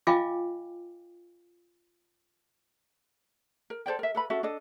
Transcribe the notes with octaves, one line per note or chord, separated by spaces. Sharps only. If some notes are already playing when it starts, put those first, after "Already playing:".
F4 D#5 F5 G5 G#5 D6
A#4
A4 C5 D5 G5
A#4 E5
A4 B4 B5
C#4 F#4 A4 E5
D4 A4 D#5